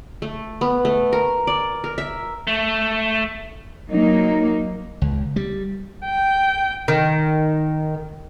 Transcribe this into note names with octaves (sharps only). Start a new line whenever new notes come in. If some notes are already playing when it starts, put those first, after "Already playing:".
A3
B3
A3
A#4
D5
A#4
E5
A3
F#3 A#3 D#4
C#2
G3
G5
D#3